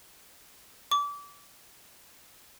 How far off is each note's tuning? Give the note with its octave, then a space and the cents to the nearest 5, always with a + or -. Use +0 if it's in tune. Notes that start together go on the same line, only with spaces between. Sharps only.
D6 -30